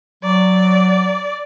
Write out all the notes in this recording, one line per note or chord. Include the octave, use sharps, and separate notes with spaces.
F#3 D5